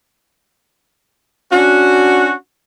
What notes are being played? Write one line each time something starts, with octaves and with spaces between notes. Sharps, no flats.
C#4 D4 F#4